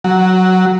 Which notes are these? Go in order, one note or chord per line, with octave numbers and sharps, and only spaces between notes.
F#3